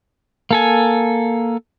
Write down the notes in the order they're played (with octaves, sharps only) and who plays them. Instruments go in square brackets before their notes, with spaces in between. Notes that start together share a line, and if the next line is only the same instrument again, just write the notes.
[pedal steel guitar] A#3 A4 G#5